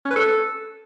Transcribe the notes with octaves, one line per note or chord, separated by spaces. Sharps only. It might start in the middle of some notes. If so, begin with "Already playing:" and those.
C#4
B4
A4